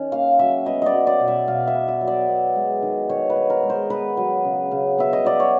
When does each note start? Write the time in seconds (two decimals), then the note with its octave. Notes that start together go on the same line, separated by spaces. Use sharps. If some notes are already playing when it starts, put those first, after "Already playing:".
Already playing: D#3 C#4
0.12 A#3 F5
0.39 F#3 E5
0.66 B3 D#5
0.82 D5 D#5
0.93 F#3
1.07 D5
1.20 B2
1.28 E5
1.47 B2 F5
1.67 E5
1.75 B3
1.88 E5
2.01 F#3
2.07 D5
2.28 B3
2.55 G#3
2.82 D#3
3.09 D#3 C#5
3.30 B4
3.36 B3
3.50 A#4
3.63 G#3
3.70 C5
3.90 B3 B4
4.17 F#3
4.45 C#3
4.71 C#3
4.98 B3 E5
5.13 D#5
5.25 F#3 D5
5.40 C#5